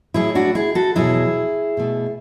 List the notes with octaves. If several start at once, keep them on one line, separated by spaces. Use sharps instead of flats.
A2 F#3 A3 E4 G#4
D4 F#4
E4 G#4
F#4 A4
E2 B2 F#3 E4 G#4
B2 A3